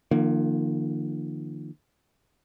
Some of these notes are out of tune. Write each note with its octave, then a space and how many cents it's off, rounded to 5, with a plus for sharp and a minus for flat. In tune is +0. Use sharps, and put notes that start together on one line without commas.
D3 +45 F3 -25 A#3 +0